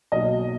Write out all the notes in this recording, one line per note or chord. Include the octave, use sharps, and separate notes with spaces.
B1 B2 F#3 A#3 D#5